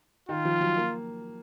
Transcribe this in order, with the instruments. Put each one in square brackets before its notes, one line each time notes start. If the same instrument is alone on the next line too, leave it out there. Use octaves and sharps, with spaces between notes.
[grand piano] D#3 [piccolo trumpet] F4
[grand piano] F3
F#3
A#3